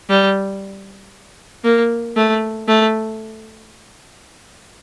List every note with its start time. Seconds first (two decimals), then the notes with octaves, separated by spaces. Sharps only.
0.10 G3
1.64 A#3
2.16 A3
2.68 A3